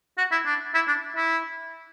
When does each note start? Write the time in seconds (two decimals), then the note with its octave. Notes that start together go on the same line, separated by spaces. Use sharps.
0.18 F#4
0.32 E4
0.45 D4
0.74 E4
0.87 D4
1.16 E4